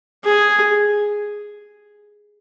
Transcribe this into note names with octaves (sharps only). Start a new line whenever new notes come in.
G#4